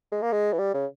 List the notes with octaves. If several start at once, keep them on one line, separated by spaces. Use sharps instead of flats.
G#3
A#3
G#3
E3
G3
C#3